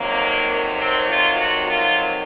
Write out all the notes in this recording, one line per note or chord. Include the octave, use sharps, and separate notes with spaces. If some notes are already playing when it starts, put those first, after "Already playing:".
Already playing: F2 C3 D#3 F#3 A#3
C4
F4
F#4
F4